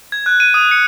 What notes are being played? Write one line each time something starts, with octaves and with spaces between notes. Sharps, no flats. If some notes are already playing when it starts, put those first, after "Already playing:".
G#6
F#6
D#7
D#6
C#7